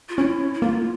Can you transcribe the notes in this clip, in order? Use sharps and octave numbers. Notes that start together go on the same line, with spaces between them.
F4
C#4 E4
E4
A#3 F4